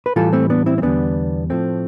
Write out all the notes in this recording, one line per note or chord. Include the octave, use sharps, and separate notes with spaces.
B4
A2 E3 G3 F4 A4
A3 C4
B3 D4
C4 E4
C4
E2 D3 G3 B3 D4
A2 F3 A3 C4